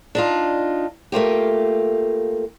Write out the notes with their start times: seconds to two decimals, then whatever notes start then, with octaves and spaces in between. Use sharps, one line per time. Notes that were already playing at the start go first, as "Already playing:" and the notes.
0.15 D4 D#4 F4
1.12 A3 A#3 F4 G4